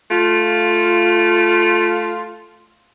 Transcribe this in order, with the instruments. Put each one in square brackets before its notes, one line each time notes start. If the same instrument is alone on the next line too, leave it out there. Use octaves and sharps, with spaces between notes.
[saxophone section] A3 F4